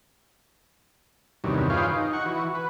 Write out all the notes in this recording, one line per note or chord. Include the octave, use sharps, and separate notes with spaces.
E2 G2 C3 D#3 F#3
F4 G#4 B4 C#5 F5 G5
D#4
F#5 C#6
E3 F#4
B4